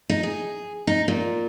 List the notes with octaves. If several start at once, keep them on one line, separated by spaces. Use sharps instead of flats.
D#4
G#4
D#4
A#2